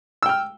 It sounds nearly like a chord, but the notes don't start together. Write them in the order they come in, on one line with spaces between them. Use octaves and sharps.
E6 G5 F6